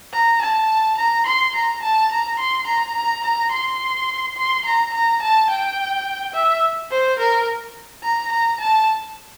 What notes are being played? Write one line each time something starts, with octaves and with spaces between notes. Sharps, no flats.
A#5
A5
A#5
C6
A#5
A5
A#5
C6
A#5
A#5
A#5
C6
C6
A#5
A#5
A5
G5
E5
C5
A#4
A#5
A#5
A5